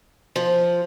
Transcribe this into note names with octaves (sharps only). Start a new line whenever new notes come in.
F3